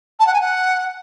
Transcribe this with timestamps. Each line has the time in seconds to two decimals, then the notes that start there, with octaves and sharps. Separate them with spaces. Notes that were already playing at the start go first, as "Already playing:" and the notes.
0.20 A5
0.27 F#5
0.34 G#5
0.41 F#5